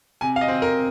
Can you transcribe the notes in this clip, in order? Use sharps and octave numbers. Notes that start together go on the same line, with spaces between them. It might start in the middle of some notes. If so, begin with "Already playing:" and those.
C3 G#5
F5
D#5
C4
A#4